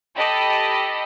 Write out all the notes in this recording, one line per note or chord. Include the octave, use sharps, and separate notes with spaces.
G4 A4 D#5 B5